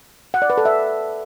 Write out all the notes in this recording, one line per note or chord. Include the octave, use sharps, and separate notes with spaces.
F#5
D5
B4
A4
E5